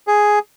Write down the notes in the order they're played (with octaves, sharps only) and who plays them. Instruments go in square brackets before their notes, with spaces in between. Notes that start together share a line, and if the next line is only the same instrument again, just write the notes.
[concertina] G#4